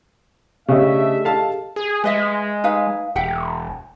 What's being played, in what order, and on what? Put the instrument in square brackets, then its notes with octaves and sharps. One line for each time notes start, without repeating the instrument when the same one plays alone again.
[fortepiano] C#3 [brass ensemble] A3 D4 E5 [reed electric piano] G4 G#4 D#5
[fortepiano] A4 F5 A5
[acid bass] G#4
[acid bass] G#3 [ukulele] B4 D#5 E5
[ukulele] D#4 B4 F5
[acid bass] E1 [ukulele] E5 F#5 G5